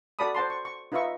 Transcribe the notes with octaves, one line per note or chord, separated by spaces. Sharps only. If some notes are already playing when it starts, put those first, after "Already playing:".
F#4 A4 D5 A5 B5 D#6
C5 F#5 A5 C6
C#6
C#6
D#4 F4 B4 D#5 E5 C#6